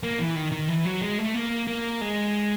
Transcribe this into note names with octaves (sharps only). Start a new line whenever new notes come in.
A#3
E3
D#3
D#3
E3
F#3
G#3
A3
A#3
A#3
G#3